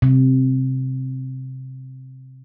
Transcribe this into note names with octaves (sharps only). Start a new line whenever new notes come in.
C3